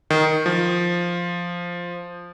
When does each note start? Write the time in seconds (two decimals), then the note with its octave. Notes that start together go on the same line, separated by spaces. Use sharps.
0.10 D#3
0.46 F3